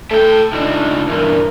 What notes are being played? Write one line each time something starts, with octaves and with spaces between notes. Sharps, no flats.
A3 A4 G5
C#2 D4 D#4
E2 G2 A#4